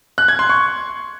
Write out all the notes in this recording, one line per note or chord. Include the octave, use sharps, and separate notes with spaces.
F#6
G#6
C6
C#6